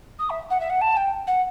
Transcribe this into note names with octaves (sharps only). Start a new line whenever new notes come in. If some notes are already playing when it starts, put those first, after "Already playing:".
D#6
E5
F#5
E5
F#5
A5
G5
F#5